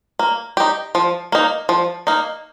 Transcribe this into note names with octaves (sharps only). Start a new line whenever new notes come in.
A#3
D#4 G4
F3
A#3 D#4
F3
A#3 D#4